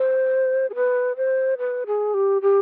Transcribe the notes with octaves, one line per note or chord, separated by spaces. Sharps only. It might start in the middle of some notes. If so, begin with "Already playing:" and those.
Already playing: C5
G#4
B4
C5
B4
G#4
G4
G4